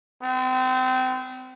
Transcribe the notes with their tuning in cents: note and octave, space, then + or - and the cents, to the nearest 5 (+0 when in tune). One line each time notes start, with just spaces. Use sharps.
C4 -30